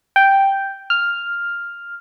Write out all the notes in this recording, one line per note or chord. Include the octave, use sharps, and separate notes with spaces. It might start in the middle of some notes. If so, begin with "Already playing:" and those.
G5
F6